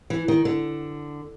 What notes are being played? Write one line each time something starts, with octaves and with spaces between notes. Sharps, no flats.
E3
D#3
D3